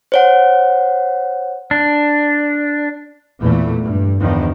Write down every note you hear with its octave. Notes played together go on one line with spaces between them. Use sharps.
C5 C#5 F#5
D4
E2 A#2 E3 A3
G2
E2 D3 D#3 F3